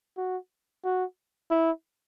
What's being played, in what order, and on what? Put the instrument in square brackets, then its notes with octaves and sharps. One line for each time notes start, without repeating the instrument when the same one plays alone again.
[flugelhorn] F#4
F#4
E4